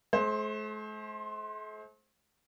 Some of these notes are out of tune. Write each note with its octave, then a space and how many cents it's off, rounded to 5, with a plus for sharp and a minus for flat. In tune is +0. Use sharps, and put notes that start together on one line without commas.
A3 -45 C5 +15